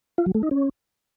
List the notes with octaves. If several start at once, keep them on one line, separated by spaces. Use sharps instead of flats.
F4
F#3
A3
D#4
C#4